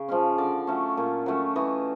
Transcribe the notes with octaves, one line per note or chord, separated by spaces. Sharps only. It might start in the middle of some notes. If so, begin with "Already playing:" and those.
Already playing: C#3
F3 G#3 C#4
D3 D5
F#3 A3 C#4
A#2
F#3 A3 C#4
E3 D#5